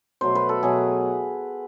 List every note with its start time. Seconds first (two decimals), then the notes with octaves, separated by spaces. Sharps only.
0.21 B2 F#3 A3 C5
0.35 B4
0.49 A4
0.63 B2 F#3 A3 G#4